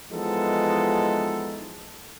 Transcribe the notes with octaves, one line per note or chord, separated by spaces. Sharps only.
E3 F3 G#3 B3 D#4 A4